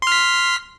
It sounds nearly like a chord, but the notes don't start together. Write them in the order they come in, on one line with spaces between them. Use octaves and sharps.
C6 F6 B6